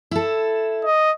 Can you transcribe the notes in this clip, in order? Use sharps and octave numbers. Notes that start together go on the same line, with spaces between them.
E4 A4
D#5